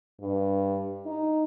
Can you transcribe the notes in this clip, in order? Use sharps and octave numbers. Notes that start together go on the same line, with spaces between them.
G2
D#4